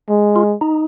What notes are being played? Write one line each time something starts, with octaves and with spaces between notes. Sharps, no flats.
G#3
F4
D#4